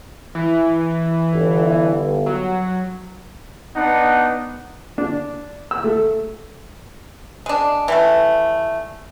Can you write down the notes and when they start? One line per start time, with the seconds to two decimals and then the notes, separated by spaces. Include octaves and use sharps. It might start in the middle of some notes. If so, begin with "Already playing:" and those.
0.35 E3
1.33 G1
2.26 F#3
3.76 B3 D4 D#4 F#5
4.98 D4
5.71 E6
5.84 A3
7.46 G#3 D4
7.88 E3 G3 A3